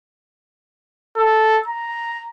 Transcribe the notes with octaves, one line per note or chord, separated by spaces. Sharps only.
A4
A#5